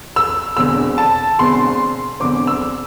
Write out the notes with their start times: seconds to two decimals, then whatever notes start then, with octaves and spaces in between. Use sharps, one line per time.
0.16 E6
0.57 E1 E2 D3 C4 E6
0.98 A5
1.39 E1 E2 D3 C4 C6
2.20 E1 E2 D3 C4 D6
2.47 E6